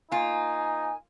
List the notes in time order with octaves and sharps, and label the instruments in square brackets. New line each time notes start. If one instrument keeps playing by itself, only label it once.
[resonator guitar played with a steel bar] A#3 F4 [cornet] D#4 [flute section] G#5